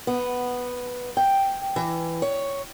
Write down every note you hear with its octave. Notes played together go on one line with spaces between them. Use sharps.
B3
G5
E3
C#5